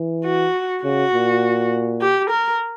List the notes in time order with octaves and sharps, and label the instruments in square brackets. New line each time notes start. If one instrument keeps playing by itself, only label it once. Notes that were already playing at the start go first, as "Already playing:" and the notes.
Already playing: [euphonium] E3
[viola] F#4
[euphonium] C#3 [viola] F#4
[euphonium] A#2
[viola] G4
A#4